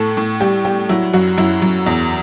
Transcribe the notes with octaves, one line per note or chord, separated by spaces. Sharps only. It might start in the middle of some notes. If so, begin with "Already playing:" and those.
Already playing: A2 A4
A2
G3 G4
G3 G4
F#3 E4
F#2 F#4
F#2 E4
F#2
E2